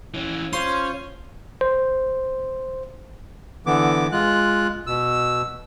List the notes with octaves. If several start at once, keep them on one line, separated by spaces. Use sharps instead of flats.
E3 C#4
C#4 F4 C5 C#5 C6
C5
D3 E3 B3 D6
G#3 F4 F#6
B2 E6